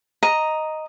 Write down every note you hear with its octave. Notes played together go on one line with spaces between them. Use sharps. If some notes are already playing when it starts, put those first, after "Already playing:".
D#5 A#5